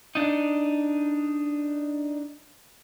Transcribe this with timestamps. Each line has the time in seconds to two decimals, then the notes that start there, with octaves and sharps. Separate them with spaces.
0.15 D4 D#4